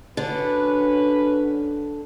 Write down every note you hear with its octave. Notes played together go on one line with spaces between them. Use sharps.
D3 C#4 F#4 B4